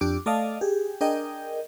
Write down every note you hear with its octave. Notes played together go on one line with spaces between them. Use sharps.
F2 D4 G4 D5 D6
A3 A4 D5 D#5 F5 A5
G4 G#4
D4 G#4 A#4 D#5 G5